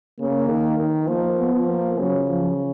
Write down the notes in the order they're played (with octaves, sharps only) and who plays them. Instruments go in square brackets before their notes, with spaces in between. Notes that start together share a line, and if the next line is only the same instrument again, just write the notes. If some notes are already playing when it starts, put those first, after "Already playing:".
[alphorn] C#3 [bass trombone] A#3
[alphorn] D#3
D#3
[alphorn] F3 [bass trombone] A#3
[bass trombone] B3
[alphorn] F3
[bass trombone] A#3
[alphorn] C#3 [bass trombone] F#3
[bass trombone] F3